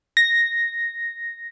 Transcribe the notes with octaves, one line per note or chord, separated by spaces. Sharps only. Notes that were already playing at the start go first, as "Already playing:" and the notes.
A#6